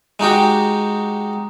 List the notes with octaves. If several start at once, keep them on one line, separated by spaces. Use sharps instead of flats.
G#3 D#4 F#4 G4